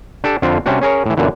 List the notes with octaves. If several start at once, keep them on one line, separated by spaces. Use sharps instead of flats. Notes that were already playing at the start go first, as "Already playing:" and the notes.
D4 G4 A4
F2 D3 C4 F4
C3 G3 C#4 D4 F#4
C#4 G#4 A#4 C#5
A2 E3
F#2 A#2 D3 E3